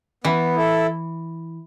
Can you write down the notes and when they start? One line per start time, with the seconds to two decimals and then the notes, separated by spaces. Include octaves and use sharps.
0.24 E3 B3
0.55 E4 A4